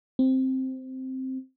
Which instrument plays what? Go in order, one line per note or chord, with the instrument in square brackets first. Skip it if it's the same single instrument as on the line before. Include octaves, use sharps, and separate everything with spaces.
[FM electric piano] C4